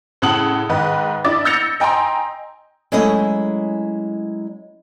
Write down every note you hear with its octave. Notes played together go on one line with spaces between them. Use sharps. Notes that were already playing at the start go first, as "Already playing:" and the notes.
A2 C#3 F#5 A5 D#6 F#7
G#2 D#3 B4
D4 E4 D#5 D6 A6
E6 G6 A6 A#6 C#7 F7
D#5 G5 G#5 A#5 C6
F#3 G#3 A3 C#4 E4 D#5